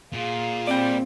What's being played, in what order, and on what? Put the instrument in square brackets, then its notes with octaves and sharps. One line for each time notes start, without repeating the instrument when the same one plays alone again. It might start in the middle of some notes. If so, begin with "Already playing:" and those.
[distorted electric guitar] A#2 [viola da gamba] F4 G#4
[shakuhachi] C4 [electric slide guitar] D5 G5